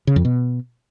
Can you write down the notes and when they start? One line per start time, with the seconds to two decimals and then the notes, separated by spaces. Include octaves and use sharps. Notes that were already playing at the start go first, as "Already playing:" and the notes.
0.07 C#3
0.16 F2
0.25 B2